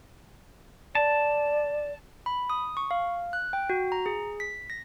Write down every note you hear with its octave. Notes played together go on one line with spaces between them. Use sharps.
D5 A5
B5
D#6
C#6
F5
F#6
G5
F#4
A#5
G#4
B6
A#6